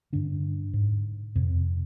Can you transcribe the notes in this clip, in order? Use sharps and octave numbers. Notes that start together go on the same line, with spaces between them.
G2 D3 D4
G#2
F2 C3